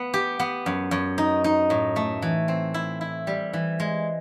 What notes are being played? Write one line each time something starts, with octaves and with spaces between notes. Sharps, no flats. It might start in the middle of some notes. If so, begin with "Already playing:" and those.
Already playing: B3
G4
B3
F#2
F#2
D#4
D#4
A2
A3
E3
C4
E4
E4
G3
E3
G#3